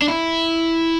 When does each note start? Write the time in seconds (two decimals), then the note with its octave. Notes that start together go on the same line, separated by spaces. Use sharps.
0.02 D4
0.08 E4